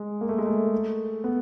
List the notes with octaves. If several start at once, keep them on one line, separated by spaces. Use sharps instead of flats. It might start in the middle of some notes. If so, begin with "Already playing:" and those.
Already playing: G#3
A#3
A3
G#3
A3
B3